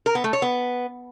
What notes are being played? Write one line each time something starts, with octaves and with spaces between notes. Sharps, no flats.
A#4
B3
A3
C#5
B3